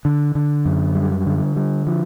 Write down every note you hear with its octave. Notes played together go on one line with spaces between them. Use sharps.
D3
D3
F#2
G3
D3
G3
F3